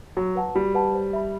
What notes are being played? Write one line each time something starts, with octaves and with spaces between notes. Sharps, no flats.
F#3 F#4
B4 F#5 A5
G3 F#4
B4 F#5 A5
C5
E5 B5